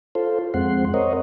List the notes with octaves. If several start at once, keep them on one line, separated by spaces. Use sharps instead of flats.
F4 A4 C5
F2 G#3 C4 F#5 C6
A#4 C5 C#5 D#5